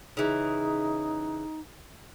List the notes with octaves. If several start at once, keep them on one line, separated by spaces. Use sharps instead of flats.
C#3 E3 D#4